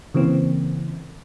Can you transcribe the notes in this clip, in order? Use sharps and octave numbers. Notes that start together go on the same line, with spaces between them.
C#3 E3 A#3 C4